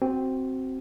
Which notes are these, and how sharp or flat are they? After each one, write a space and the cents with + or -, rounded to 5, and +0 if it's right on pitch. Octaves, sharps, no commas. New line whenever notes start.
C4 +0 F#4 +20